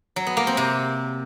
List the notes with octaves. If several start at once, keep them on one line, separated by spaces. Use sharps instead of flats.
F#3
B3
A#3
C4
C3